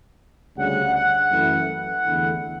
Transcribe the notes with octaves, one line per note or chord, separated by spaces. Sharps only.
D2 C#3 G3 F#5
F#5
F#2 E3 A3 E4
F#5
E2 D3 A3 E4